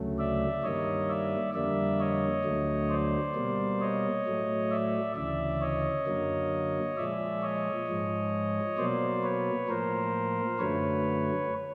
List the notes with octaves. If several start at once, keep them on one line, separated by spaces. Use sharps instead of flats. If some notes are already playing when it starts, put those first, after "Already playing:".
Already playing: D2 C#3 F#3 A3
D5 E5
G2 D#3 G3 A#3 C#5 D#5
D5 E5
F2 D3 G3 A#3 D5 E5
C#5 D#5
D2 D3 F#3 A3
C5 D5
B2 G3 A#3
C#5 D#5
A2 F#3 A3
D5 E5
D2 C#3 E3 D5 E5
C#5 D#5
F#2 D3 F#3 A#3
A#2 F3 G#3 D5 E5
C#5 D#5
G#2 F3 G#3
B2 F#3 A#3 C5 D5
B4 C#5
A2 F3 A#3 A#4 C5
F#2 D3 F#3 A3 B4 C#5